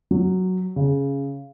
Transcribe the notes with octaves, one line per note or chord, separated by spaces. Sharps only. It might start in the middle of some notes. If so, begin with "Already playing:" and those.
F#3
C#3